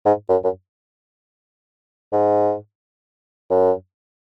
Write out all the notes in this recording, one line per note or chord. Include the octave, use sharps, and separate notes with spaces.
G#2
F#2
F#2
G#2
F#2